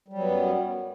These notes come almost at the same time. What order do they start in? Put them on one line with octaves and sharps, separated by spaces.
G3 F#3 B3 F#2